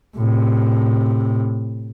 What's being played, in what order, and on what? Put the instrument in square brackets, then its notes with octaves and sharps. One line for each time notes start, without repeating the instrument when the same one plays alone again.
[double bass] A2 C3